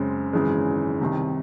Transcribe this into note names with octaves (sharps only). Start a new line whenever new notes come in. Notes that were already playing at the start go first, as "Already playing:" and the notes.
Already playing: F#2 C#3 G#3 C4
G#1 F#2 C#3 E3 G#3
C2 C3 D#3